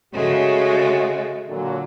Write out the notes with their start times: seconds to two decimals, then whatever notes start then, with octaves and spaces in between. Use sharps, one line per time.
0.14 C#3 G#3 A3 F#4
1.49 A#2 D3 F#3